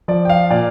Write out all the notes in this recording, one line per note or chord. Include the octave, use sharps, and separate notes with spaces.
F3 D5
G5
F5
A#2 D5